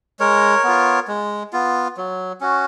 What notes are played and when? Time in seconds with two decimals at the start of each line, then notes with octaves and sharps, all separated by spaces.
0.20 G#3 A#4 C#5
0.64 B3 F4
1.08 G#3
1.53 B3 F4
1.97 F#3
2.41 C#4 F#4